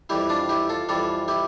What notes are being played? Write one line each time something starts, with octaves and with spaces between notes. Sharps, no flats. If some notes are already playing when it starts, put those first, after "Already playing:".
F2 E3 G3 E4 G4
D4 F4
E4 G4
F4 A4
F2 E3 G3 F4 A4
E4 G4